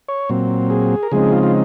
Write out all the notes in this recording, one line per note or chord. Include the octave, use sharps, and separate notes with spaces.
C#5
A#2 F#3 C4
G#4
A#4
C#3 F3 G#3 C4 D#4 G#4
F4
F4